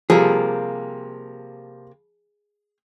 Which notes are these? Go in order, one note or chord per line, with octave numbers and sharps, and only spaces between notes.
C3 F3 G3 A#3 G#4 A4